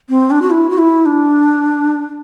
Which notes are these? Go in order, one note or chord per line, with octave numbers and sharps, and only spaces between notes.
C4
D4
F#4
E4
F#4
E4
D4